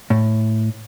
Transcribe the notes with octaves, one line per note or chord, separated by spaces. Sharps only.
A2